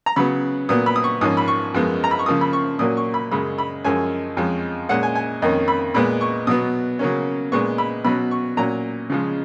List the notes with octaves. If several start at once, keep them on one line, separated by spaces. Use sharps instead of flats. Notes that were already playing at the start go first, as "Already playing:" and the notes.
A#5
C#3 F#3 B3 B5
A#2 F#3 B3 D#6
B5
D#6
C#6
G#2 F3 A#3 C#4 D#6
B5
C#6
F#2 F3 G#3 B3
A#5
B5
C#6
C#3 F3 A#3 D#6
B5
C#6
A#2 F#3 A#3 C#4 D#6
C#6
B5
F#2 C#3 G#3 B5
B5
F#2 F3 G#3 C#4 G#5
F2 F3 G#3 C#4
A#2 G#3 C#4 F#5
G#5
G#5
F2 D#3 A#3 C#4 D#5
B5
A#2 G#3 B3 B5
C#6
B2 F#3 B3 D#6
C#3 F#3 A#3 C#4
A#2 G#3 B3 C#6
B5
B2 F#3 C#4 B5
C#6
A#2 F#3 C#4 A#5
C#3 F3 G#3